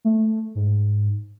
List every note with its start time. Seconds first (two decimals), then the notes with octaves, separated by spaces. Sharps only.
0.05 A3
0.55 G#2